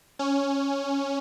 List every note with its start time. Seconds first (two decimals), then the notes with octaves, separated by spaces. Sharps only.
0.19 C#4